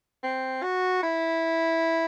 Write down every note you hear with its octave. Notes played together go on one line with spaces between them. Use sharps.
C4
F#4
E4